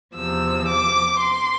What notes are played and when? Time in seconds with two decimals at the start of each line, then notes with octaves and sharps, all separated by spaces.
0.16 E2 C3 F3 E6
0.69 D6
1.21 C6